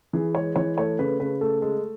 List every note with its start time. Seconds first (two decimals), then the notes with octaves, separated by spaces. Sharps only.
0.13 E3 G#4
0.35 G#3 C#5
0.56 E3 C#5
0.77 A3 C#5
0.99 C#3 B4
1.19 C#3 B4
1.41 A3 A4
1.62 G#3 A4